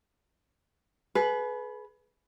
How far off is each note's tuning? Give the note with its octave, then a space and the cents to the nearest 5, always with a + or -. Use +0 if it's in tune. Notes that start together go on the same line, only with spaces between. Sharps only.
G#4 +40 B4 +0